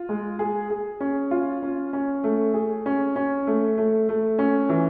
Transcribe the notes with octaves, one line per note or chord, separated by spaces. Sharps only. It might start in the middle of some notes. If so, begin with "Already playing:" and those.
Already playing: F4
G#3
G#4
G#4
C#4
F4
C#4
C#4
A3
G#4
C#4
C#4
A3
A3
A3
C#4
E3